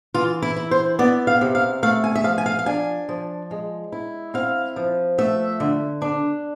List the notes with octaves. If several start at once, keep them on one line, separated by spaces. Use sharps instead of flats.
E3 F4
E4
E4
C5
B3 D5
F5
C3
F5
A3 F5
G#5
E5
F3 F5
G#5
F5
F5
D4 G#5
F3
G#3
E4
C4 F5
F3
A3 E5
D3
D4